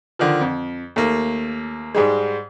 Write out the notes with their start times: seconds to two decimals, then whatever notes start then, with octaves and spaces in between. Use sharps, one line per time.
0.19 D3 D#3 F3
0.41 F2
0.96 D#2 A3 A#3
1.94 G#2 G3 G#3